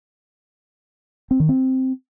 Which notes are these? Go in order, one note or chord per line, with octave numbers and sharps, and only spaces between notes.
C4
D#3
C4